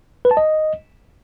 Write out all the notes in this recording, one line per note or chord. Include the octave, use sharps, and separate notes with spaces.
B4
A5
D#5